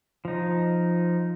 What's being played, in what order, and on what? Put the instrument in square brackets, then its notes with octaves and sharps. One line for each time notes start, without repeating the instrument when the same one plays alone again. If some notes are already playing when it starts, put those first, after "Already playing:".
[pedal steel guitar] F3 D#4